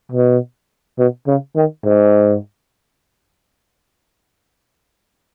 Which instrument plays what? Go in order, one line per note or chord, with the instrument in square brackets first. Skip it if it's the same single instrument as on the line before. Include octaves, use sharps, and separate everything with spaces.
[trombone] B2
B2
C#3
D#3
G#2